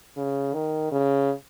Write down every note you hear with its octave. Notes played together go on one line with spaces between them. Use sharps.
C#3
D#3
C#3